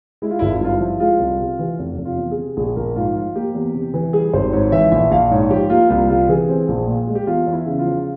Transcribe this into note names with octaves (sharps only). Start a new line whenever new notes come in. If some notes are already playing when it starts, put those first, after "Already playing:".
G#3 E4
F4
G#1 E4
F4
E4
G2 F4
E4
F3
G#3 F4
C2
C3
E3
F1
F1
F4
E2
G#4
C3
A#1 G#4
A#1 A#4
G#2 F4
F3 F4
A#3 G4
E2
C3
E3
G3 G#4
G#1 C5
G#2 C#5
E3 E5
A#1 E5
A#1 F5
G#2 C#5
F3 G4
A#3 F4
C2 F4
C3 F4
E3 G#4
C4
A#1
A#2
G#3
G4
E2 F4
E2
E4
C#3
F4
F3